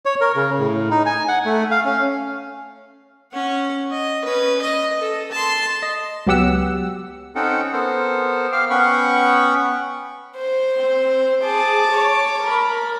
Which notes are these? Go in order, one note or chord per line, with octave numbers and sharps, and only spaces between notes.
C#5
A#4
C#3
A2
D#4
G#5
F#5
A3
F5
C#4
C#4 F#5
D#5
C#4 B4
D#5
A4
A5 C6
D#5
C#2 F#3 B3 G4 F#5 E6
C4 C#4 D#4 A4 F#5 G5
B3 A4 A#4 C5
F5 G5 D6 F6
B3 C#4 F#5 G5 B5 C#6
C5
C4
G#4 A5 D6
C#5
A#4 B5